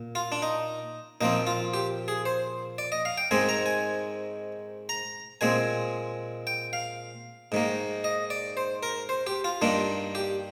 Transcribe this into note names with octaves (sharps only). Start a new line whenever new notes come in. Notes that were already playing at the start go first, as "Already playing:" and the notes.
Already playing: A#2
F4
D4
D#4
A#2 F3 C4 D#4
F4
G4
G#4
C5
D5
D#5
F5
G5
G#2 D#3 G#3 C4 G#5
A#5
G#5
A#5
A#2 G#3 C4 G#5
G5
F5
G#2 D#3 A#3
D#5
D5
C5
A#4
C5
G4
F4
G2 D#3 A#3 D4
G4